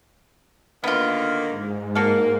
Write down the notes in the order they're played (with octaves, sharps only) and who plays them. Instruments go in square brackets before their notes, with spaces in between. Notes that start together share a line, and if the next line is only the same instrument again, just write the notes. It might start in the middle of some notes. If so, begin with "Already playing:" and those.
[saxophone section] D3 D#3 A#3 [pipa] B3 F4
[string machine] G#2
[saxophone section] A#3 [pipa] F#4 A4 F5